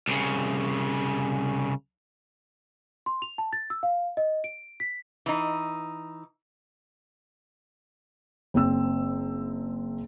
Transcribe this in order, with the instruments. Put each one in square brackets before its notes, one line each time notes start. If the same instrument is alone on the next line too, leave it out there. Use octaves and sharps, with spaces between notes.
[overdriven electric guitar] C2 C#3
[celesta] C6
F7
A5
A6
E6
F5
D#5
D7
B6
[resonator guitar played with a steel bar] E3 D#4
[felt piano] F#1 C4 E6